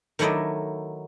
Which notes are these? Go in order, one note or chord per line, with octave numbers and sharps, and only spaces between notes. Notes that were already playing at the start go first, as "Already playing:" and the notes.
D#3 F#3 A3 E4 D5 D#5